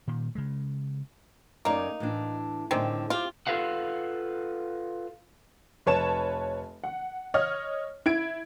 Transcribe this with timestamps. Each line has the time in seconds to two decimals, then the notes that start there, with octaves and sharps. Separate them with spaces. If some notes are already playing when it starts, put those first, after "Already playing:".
0.07 A#2 D#3
0.35 C#3 G#3
1.65 F#2 A3 A#3 D#4 D5
2.00 A2 E3 D4
2.71 A2 D3 D#3 G3 G#3 C4
3.10 C4 F4 G4
3.47 F4 A4 B4 F5 F#5
5.86 F1 B4 C#5 A5 E7
6.84 F#5
7.34 C#5 D#5 F6
8.06 E4 G#6 D7